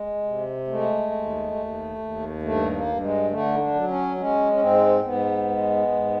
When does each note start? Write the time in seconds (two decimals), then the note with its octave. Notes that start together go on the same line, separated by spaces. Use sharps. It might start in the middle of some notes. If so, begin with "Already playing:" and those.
Already playing: G#3
0.23 C3
0.67 G#3 A3
1.11 D#2
1.55 D#2
1.98 D#2
2.42 G2 A3
2.72 A#3
2.85 G2
3.00 G#3
3.29 D3 A3
3.54 D#4
3.59 D4
3.74 F#3
3.88 C#4
4.17 G#3 C#4
4.52 C#4
4.60 G#2 C4
5.04 G#2 B3
5.48 G#3
5.92 G#2